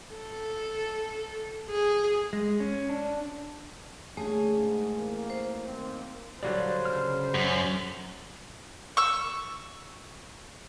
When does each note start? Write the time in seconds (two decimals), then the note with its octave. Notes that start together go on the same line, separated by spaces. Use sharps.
0.15 A4
1.70 G#4
2.33 G#3
2.60 C#4
2.89 D4
4.17 D3 A3 A#3 C#4 G#4
4.59 G#2
4.96 A1 A#3
5.30 C5
5.66 D#3 A#3 C4
6.43 D3 F#3 G3 C5 D5 F5
6.86 C#3 F6
7.35 F#2
8.97 C#6 E6